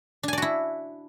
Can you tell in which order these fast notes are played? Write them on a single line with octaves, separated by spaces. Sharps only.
D4 G#5 D5 F#4 E4